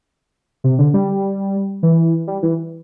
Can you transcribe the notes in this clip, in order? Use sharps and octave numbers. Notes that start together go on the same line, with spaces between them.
C3
D3
G3
E3
G3
E3